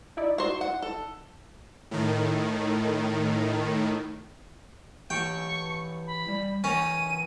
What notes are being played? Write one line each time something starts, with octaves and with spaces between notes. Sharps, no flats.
D#4 E4 D5
F#4 C5
F#5
A4
A2 D#3
E3 G4 G5 C#6
B5
G3
E3 C#4 A#4 D#7